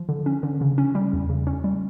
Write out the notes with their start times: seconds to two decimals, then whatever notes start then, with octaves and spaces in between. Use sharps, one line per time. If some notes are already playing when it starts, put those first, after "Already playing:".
Already playing: F3
0.09 D3
0.26 C#4
0.43 D3
0.61 C#3
0.78 C#4
0.95 G3
1.13 E2
1.30 C#3
1.47 C#4
1.64 G3